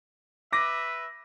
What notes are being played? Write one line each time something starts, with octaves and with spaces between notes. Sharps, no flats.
B4 E5 D6 A#6